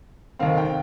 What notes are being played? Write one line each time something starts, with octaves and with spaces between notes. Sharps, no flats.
F1 D#2 D#3 C4 F5
G5